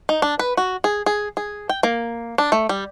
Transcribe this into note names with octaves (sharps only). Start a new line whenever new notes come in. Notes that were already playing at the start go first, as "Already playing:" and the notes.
D#4
D4
B4
F#4
G#4
G#4
G#4
G5
A#3
D4
A3
G3